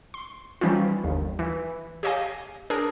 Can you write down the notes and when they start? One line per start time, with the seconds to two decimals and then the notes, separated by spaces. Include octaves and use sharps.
0.14 C6
0.61 E3 F3 G3 C#4 D#4 F4
1.04 G1 D#2
1.39 E3
2.03 G4 C#5 D#5 F5 G#5
2.70 D4 G#4 A#4